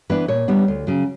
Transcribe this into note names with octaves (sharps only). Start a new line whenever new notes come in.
E3 B3 D4 B4
A#2 C#5
G3 B3 D4
D2
C#3 F#3